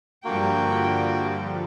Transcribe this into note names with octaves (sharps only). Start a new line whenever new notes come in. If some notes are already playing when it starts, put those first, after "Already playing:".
G2 D3 F3 G3 A#3 F#4 G5